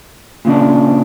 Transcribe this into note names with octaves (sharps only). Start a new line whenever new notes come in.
A#2 C#3 D4